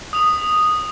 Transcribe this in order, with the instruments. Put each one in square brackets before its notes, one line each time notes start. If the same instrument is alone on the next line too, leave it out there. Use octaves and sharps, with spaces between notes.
[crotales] D#6 F7